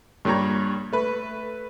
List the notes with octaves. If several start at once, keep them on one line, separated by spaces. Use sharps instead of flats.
G2 A#2 G3 C#5 A#5
A3 B4